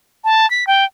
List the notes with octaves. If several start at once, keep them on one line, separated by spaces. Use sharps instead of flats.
A5
B6
G5